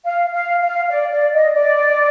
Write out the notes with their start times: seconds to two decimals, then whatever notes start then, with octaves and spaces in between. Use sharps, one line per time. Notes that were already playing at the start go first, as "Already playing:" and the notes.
0.05 F5
0.33 F5
0.61 F5
0.90 D5
1.11 D5
1.33 D#5
1.54 D5